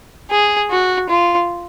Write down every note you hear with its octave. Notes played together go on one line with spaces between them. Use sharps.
G#4
F#4
F4